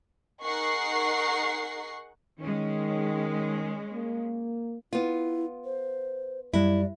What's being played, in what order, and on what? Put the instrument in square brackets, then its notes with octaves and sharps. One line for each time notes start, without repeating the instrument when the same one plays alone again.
[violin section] D#4 G#4 A#4 F#5 C#6 C7
[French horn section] D#3 [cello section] G#3 C#4
[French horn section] A#3
[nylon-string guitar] B3 F4 [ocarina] E4
[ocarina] C5
[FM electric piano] F#2 G3 [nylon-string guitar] E4 [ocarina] D5